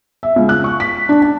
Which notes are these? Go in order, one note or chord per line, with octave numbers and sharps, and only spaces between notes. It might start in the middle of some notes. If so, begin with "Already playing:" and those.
E5
C#2
F#6
C#6
B6
D4
A5